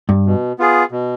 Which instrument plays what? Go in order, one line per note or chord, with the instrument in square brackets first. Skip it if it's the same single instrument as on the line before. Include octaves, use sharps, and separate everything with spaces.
[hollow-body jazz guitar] G2
[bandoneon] B2
B3 F4 G#4
B2